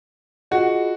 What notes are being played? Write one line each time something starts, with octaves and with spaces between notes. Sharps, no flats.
F4 F#4 G#4 D#5